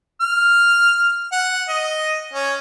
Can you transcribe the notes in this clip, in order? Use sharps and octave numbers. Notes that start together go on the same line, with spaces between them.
F6
F#5
D#5
C#4